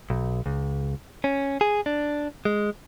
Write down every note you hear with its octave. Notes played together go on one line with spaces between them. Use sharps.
B1
C#2
C#4
G#4
D4
G#3